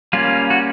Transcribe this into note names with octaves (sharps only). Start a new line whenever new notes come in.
G3 A#3 C#4 F4
F#4